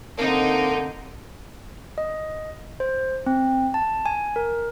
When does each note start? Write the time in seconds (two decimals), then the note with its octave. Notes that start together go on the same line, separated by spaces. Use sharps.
0.19 D3 A#3 C4 D#4
1.98 D#5
2.80 C5
3.26 C4
3.74 A5
4.06 G#5
4.36 A#4